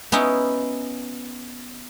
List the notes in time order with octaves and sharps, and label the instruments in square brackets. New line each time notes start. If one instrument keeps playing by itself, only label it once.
[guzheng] B3 C#4 D#4 E4